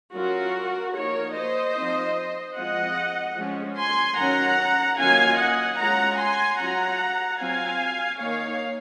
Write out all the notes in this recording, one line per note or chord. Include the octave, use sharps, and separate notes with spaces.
F#3 C#4 F4 F#4 A#4
F3 A#3 D#4 A#4 C#5
C5 D#5
F3 C4 D#4
F3 G#3 C4 F4 D#5 F#5
F3 G#3 C#4
G#5 C6
D#3 F#3 C#4 F#5 A#5
D#3 F#3 A#3 C#4 F4 F5 G#5
D#5 F#5
G#3 C#4 F4 F#5 A#5
G#5 C6
F#3 C#4 F4 F#5 A#5
F#3 C4 F4 F5 G#5
D#3 A#3 D#4 C#5 F5